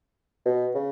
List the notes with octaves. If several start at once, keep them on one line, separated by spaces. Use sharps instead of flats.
B2
C#3